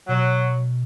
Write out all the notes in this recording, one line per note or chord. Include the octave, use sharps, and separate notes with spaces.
B2 F#3